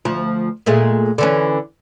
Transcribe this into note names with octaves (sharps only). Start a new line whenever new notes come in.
D2 F3
A#2 G#3 A3
D3 E3 C#4